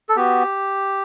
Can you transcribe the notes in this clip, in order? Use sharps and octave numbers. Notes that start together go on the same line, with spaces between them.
A4
B3 F#4 G4